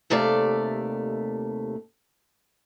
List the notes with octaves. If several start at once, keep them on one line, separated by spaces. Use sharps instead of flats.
D#2 C3 A3 D5 F5